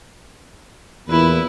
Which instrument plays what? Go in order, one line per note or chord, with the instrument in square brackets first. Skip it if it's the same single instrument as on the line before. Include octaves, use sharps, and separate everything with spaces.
[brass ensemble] E2 A#2 [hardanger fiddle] E4 B4